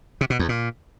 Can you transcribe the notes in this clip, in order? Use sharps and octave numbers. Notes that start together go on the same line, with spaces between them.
C3
B2
E2
A#2